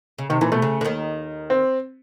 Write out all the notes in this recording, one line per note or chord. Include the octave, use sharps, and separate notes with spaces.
C#3
C3 D#3
A#2 E3
B2 A3
C#3
D3
D#2 D#3
C4